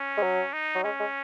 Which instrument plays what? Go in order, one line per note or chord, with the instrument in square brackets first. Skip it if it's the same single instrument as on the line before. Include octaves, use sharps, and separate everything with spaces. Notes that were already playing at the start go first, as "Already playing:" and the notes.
Already playing: [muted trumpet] C#4
[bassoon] G#3
F#3
[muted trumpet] D#4
[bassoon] F#3
[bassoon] G#3 [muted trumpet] C#4
[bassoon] G#3